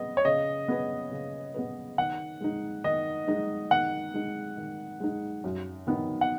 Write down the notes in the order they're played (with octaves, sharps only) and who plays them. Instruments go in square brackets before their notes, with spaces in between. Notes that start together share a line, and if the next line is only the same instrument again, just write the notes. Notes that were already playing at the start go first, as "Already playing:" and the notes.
Already playing: [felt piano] C#3 B3 G#4 B4 [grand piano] D#5
[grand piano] C#5
[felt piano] C#3 [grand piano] D#5
[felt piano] B3 G#4 B4
C#3
B3 G#4 B4
[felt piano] D#3 [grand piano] F#5
[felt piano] G#3 D#4
[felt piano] D#3 [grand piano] D#5
[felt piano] G#3 D#4
[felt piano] D#3 [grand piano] F#5
[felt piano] G#3 D#4
D#3
G#3 D#4
F#2
D#3 B3 D#4
[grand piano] F#5